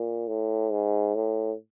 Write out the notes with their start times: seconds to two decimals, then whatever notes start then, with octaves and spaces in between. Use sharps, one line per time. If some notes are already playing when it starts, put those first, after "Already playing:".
Already playing: A#2
0.28 A2
0.71 G#2
1.15 A2